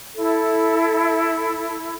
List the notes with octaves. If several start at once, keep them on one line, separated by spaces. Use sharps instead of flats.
E4 A4